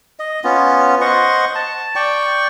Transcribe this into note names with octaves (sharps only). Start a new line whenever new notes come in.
D#5
B3 C#4 F4
C5 D#5 F#5 C#6
A5
D5 G5 C#6